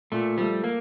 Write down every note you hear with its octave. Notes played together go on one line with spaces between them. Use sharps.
A#2 A3
F3 G3 A3
A#3